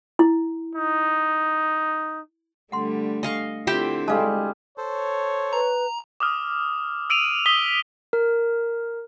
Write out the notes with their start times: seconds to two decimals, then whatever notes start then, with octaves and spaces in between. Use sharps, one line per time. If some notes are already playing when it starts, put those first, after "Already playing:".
0.19 E4
0.75 D#4
2.72 D3 G3 A3 F#5 C6
3.23 D#5 F5 G#5 C#6
3.67 D3 C4 E4 F4 G4 E5 G5
4.08 G3 G#3 A4 F5 A5
4.78 A4 C5 C#5
5.53 B4 A#5
6.20 D6 D#6 F6
7.10 E6 D7 D#7 F7
7.46 D#6 B6 G7
8.13 A#4